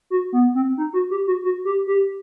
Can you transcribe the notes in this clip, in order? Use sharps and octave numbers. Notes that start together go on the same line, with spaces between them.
F#4
B3
C4
D#4
F#4
G4
F#4
F#4
G4
G4